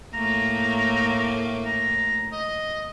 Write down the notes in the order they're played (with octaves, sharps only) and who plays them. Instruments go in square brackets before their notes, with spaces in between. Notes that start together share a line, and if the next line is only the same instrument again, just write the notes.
[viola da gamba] A2 A3 A#3 [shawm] A#5
[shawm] A#5
D#5